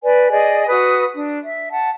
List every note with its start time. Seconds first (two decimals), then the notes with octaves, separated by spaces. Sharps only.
0.03 B4 D5 G#5
0.31 G#4 D5 D#5 G#5
0.67 F#4 B4 D#6
1.13 D4
1.43 E5
1.71 F#5 A5